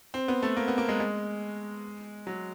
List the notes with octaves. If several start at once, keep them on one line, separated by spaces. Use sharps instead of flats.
C4
B3
A3
A#3
B3
A#3
G#3
G#3
F#3